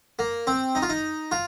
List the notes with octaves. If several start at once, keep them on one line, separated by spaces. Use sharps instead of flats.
A#3
C4
D#4
F4
D#4
F4